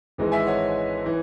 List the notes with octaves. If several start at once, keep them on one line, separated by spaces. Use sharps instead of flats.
G#1 G#2 E3 G#3
E5 G#5
C#5 F#5
E3